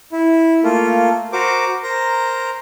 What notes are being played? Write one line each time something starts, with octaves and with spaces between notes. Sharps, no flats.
E4
A3 A#3 F4
F#4 A#4 C5 D6
A#4 C5 A#5